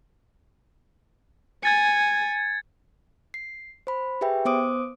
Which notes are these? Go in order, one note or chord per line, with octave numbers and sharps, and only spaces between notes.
G#5 G#6 A6 C#7
C7
C5 B5
G4 G#4 B4 E5 G5
B3 C5 D6 D#6 D7